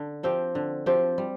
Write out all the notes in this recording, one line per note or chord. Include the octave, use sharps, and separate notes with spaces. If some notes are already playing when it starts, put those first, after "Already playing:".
Already playing: D3
F3 C4 G4
D3
F3 C4 G4
G3